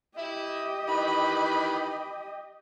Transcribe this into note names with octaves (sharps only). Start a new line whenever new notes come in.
E4 G4 D#5 E6
D#3 E3 B5